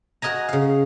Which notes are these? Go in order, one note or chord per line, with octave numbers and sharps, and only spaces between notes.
F#4 A#4 D#5 G#5 A#5
C#3 F5